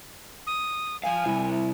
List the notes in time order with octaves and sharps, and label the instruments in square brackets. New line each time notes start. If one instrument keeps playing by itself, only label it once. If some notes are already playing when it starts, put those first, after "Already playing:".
[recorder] D#6
[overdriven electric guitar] F3 F5 [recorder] G#5
[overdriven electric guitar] C3 G3 [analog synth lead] E4